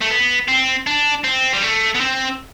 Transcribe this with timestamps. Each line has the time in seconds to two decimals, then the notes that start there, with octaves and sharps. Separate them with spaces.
0.01 A3
0.11 B3
0.48 C4
0.87 D4
1.25 C4
1.54 G3
1.63 A3
1.95 B3
2.01 C4